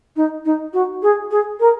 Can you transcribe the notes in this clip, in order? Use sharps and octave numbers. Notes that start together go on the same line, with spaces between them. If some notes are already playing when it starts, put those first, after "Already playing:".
D#4
D#4
F#4
G#4
G#4
A#4